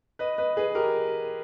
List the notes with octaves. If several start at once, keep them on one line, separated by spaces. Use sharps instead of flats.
B4 D#5
B4 D#5
G#4 B4
G4 A#4